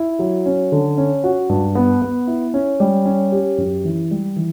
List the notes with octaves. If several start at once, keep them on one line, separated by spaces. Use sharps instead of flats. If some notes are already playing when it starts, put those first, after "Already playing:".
Already playing: E4
F#3
C#4
D3
C#4
F#4
G2
B3
B3
E4
C#4
G3
C#4
G4
F#2
E3
G3
E3